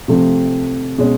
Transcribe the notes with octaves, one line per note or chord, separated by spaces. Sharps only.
C3 F3 A3 C4
B2 G#3 C#4